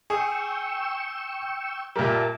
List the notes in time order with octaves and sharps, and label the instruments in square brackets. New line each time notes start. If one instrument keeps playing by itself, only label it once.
[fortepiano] G#4 [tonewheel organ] G5 C#6 E6
[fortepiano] A#2 G3 [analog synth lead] A#4 [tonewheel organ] E5 A5